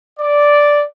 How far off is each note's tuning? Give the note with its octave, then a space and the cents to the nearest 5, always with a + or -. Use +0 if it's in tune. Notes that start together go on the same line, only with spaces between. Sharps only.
D5 -5